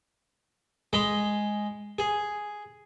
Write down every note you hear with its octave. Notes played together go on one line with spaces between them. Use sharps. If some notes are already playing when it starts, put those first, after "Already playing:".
G#3 D#5 B5
G#4